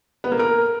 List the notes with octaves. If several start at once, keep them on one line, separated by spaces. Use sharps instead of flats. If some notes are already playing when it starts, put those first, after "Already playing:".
B3
A#3
A#4